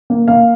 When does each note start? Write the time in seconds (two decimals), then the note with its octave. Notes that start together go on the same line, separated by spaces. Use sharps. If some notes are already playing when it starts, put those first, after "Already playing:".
0.10 A#3
0.28 A#3 F5